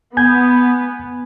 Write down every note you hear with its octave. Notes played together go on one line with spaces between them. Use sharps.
B3 G#5 G6 G#6